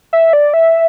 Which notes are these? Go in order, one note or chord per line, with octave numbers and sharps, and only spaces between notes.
E5
D5
E5